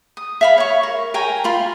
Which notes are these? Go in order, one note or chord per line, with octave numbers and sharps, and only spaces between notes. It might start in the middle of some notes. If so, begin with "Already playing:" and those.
D#6
E5 F5 B5
C#5 C#6
A#4
A#4 G5 G#5 A#5
F4 B5 C6